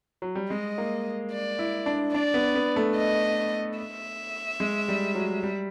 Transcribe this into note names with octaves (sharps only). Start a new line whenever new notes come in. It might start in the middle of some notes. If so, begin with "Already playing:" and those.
F#3
G3
G#3 D#5
A#3
D5
E4
D4
D4 D5
B3
B3
A3
D#5
E5
G#3
G3
F#3
G3